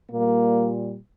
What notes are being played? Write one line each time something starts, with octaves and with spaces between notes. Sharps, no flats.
A#2 G3 A#3